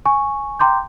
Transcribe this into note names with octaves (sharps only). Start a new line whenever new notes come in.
G#5 C#6
G5 A#5 C6 D6 G6